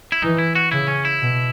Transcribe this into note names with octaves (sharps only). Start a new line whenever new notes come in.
E4
E3 D#4
E4
F#4
C#3 E4
C#4
E4
B2